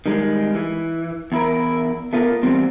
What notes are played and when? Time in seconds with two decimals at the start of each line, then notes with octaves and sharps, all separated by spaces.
0.06 D#3 G3 G#3
0.55 E3
1.32 E2 E4 A#4
2.13 A3 B3 F4 F#4 A#4
2.43 E3 G3 B3 C4